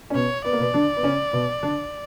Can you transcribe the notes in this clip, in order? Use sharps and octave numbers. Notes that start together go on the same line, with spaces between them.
C#4
B2 B3 C#5
B3 D5
A#3
B2 B3
D3 D4
B3
C#3 C#4
B2 B3
D3 D4